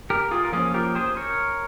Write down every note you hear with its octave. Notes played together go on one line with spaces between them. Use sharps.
G4 A#4
F4 G#4
A#4
F3 A#3 C#4 F4 G#4
G4 A#4
G#4 C5
A#4 C#5